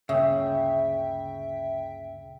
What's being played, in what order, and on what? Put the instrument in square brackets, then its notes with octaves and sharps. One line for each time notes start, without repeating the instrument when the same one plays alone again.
[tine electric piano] D2 G2 A#2 [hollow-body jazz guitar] C#3 [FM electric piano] E5 G5